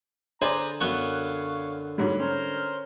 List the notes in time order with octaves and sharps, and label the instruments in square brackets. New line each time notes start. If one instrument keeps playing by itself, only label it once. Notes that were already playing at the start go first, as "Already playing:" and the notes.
[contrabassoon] D3 [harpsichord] G#4 B4 [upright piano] C5 D5 [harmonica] A#5
[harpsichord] F#2 B3 C#6 [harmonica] C#5 F5 [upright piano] F#6
[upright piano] G#2 F#3 G3
[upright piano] C#4 [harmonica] A#4 C5 F6